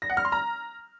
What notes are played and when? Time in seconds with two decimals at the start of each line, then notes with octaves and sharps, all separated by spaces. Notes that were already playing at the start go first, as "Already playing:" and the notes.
0.02 A#6
0.10 F#5
0.17 F6
0.25 C6
0.32 A#5